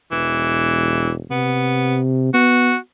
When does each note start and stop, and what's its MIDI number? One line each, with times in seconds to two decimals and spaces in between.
0.11 1.23 28
0.11 1.11 52
1.31 2.31 48
1.31 1.98 59
2.34 2.74 59
2.34 2.76 66